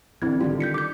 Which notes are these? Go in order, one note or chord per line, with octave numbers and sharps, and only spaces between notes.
A1 D3 C4 E4 G#6
D3 D#3 G3 F4
G6 B6 C#7
D6 G6